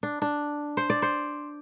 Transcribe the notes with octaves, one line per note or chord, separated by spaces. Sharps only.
D4
D4
C5
D5
C5